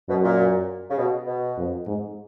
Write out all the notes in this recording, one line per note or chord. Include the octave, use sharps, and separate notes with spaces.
F#2 B2
A#2
C#3
B2
B2
F2
G#2